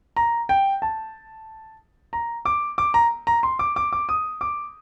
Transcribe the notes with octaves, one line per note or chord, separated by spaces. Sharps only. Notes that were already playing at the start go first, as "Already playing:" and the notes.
A#5
G5
A5
A#5
D6
D6
A#5
A#5
C6
D6
D6
D6
D#6
D6